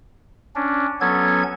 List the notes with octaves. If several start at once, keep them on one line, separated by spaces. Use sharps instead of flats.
C#4 D4
F#3 B3 C#4 A4 G#6